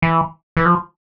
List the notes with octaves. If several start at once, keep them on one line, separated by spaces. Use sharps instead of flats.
E3
E3
F3